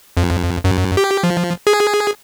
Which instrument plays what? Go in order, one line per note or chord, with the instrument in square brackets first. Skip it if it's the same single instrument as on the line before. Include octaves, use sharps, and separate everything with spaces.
[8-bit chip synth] F2
F#2
G4
F3
G#4